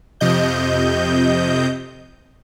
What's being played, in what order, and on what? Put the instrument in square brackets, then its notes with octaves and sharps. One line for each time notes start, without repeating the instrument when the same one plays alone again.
[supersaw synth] F2 C3 D#5 G6